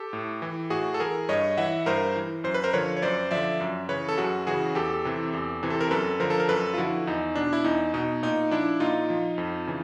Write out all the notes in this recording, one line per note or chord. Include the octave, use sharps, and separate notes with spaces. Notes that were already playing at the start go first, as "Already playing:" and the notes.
Already playing: G4 A4
A2
E3
A2 F#4 G#4
A4
E3 G#4 A#4
G2 C#5 D#5
E3 E5 F#5
G2 A#4 C5
E3
F#2 C5
B4
A#4 C5
D3 F3 B4 C#5
C#5
F#2 C5 D5
D3 F3 D5 E5
F#2
C#3 E3 B4 C#5
A4
F#2 F#4 G#4
C#3 E3 F#4 G#4
E2 G4 A4
C3 E3
E2
C3 E3
A4
A#4
F#2 A4 B4
D3 F3 A#4 C5
A4
A#4
F#2 A4 B4
F4
D3 F3 E4 F#4
E2 D#4
B2 D4
E4
E2 D#4
B2 D#4
A#2 D#4
F3 D4 E4
A#2 D#4 F4
F3
F2
C#3 E3